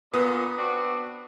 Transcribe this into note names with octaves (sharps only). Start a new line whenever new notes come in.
A#2 D3 B3 D#6
C4 D4 F#4